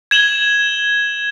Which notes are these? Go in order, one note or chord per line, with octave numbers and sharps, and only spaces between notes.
G#6 E7 F#7 G7